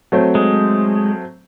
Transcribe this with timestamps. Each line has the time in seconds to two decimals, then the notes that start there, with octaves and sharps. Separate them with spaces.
0.12 F#3 A3 C4
0.35 G#3